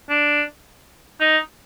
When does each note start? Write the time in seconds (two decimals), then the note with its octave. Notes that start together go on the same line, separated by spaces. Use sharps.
0.10 D4
1.21 D#4